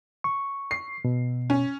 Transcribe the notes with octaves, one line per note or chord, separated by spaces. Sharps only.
C#6
C7
B2
C#4